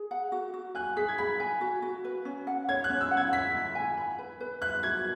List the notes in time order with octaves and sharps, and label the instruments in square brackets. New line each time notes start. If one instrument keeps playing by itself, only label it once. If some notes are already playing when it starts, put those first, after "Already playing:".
Already playing: [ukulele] G#4
F#5
F#4
F#4
[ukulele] G#5 [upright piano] F#6
[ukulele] G#4 [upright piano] B6
[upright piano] G#6
[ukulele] B5 [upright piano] B6
[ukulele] G#5
F#4
F#4
B4
C#4
F#5
[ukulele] C#5 [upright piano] G#6
[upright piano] F#6
[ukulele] C#4
[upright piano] E6
[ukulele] F#5
[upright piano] G#6
[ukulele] E5 [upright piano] B6
[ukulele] E4
G#5
B5
B4
B4
[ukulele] E5 [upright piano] F#6
[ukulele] F#4 [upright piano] G#6